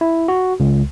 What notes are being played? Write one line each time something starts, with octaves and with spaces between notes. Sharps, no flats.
E4
F#4
C#2